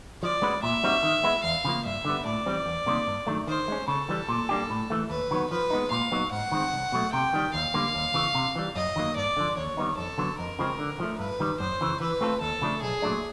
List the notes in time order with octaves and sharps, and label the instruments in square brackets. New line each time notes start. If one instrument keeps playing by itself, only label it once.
[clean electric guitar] F3 [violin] D5
[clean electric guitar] G#3 C#4 F#4 B4
[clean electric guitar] A#2 [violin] E5
[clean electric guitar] G3 C4 D#4 F#4
D#3
G#3 B3 E4
[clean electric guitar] E2 [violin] F5
[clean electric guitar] C#3 F3 A#3
[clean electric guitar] G2 [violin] E5
[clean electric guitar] D3 G3 B3
[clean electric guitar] A2 [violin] D5
[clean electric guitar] E3 G3 C4
E2
C3 D#3 G3 A#3
G2
D#3 F#3 A3 D4
[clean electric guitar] D#3 [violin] C5
[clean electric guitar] G#3 C#4
[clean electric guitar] C#3 [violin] A4
[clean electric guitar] E3 G3
A#2
G3 A#3 D4 G4
A2
E3 A3
[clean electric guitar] D#2 [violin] B4
[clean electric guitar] D#3 F#3 B3
[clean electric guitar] F3 [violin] B4
[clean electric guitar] G#3 B3 D#4
[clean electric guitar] A#2 [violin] F5
[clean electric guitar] F#3 B3 D#4 F#4
[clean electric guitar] G#2 [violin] F#5
[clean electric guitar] D#3 G#3 C4
C2
B2 F#3 A3
[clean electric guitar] C3 [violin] G5
[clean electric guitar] D#3 G3
[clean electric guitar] D#2 [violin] F5
[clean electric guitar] D3 G3 A#3
D#2
C#3 E3
C3
E3 G3
[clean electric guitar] F#2 [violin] D#5
[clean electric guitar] D#3 F#3 A#3
[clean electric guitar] G2 [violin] D5
[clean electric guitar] D3 F3
[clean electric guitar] D#2 [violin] C#5
[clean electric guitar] D#3 G3 B3 D#4
[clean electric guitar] F2 [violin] A4
[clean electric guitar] D3 F#3 B3
[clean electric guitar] F2 [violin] A#4
[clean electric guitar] C#3 F3 G#3 C4
D3
F3 A3
[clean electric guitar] G2 [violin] B4
[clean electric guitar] D#3 G3
[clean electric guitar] F#2 [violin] C5
[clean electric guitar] C#3 E3
[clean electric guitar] E3 [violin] B4
[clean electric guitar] A3 C4 F4 A4
[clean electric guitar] D#2 [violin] A4
[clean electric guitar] C#3 F3 A3 D4
[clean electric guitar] B1 [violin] G#4
[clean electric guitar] A#2 F#3 A3 D4